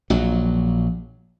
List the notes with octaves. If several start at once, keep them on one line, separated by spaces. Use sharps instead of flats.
A#1 F#3